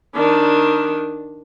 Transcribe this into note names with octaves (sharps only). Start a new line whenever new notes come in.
D#3 D4